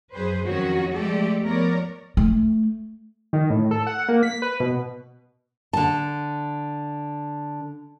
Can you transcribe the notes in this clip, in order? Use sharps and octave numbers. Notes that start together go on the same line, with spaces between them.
F#2 G#4 B4 C5
F2 D#3 F#3 C#4 F#4 C#5
F3 G#3 A3 G4 A4 D5
F3 B3 A#4 C#5 D5
A3
D#3
A2
A4
F#5
A#3
B6
B4
B2
D3 A5